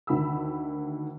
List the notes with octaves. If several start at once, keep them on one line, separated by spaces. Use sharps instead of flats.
D2 D#3 B5 E6